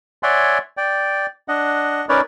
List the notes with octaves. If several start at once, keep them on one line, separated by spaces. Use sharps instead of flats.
C#5 D5 E5 F#5 G#5 C6
D5 G5
D4 D#5 F#5
C#4 D#4 A#4 B4 C#5 D5